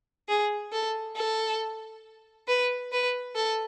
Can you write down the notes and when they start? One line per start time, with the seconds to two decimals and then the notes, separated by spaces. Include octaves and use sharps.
0.28 G#4
0.72 A4
1.16 A4
2.48 B4
2.92 B4
3.35 A4